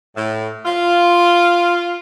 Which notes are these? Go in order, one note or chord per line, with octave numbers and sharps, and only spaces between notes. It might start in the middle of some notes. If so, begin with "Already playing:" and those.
A2
F4